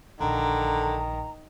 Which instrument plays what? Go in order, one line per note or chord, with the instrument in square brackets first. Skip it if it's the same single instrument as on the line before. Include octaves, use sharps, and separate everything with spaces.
[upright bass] A#1 [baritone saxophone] D3 [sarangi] D#3 [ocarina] A#5